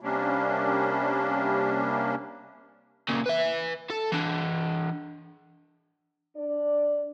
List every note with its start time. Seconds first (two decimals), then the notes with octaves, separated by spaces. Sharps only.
0.01 C3 G3 A#3 C#4 D4
3.08 A#2 C#3
3.26 B4 E5
3.90 A4
4.12 E3 D4
6.36 D4 D5